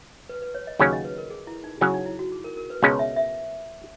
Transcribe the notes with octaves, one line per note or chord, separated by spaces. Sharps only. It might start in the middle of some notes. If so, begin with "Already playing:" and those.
B4
B4
C#5
D#5
D#2 C#3 F#3 C#4 C#5
D#5
B4
A#4
G#4
E4
D#4
C#3 F#3 C#4 E4
D#4
E4
F#4
G#4
A#4
A#4
B4
C#2 B2 G#3 C#4 G#4 C#5
E5
E5